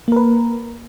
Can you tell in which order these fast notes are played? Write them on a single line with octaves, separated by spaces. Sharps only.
A#3 A#4 B4